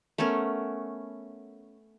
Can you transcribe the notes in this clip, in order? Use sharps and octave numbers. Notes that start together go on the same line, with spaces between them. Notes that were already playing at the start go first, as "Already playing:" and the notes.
A3 B3 C#4 A#4